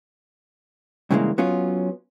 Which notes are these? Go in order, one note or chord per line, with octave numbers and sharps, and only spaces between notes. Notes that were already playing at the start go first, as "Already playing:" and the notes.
G2 C#3 E3 F#3 G#3 A#3
F#3 B3 C#4 F4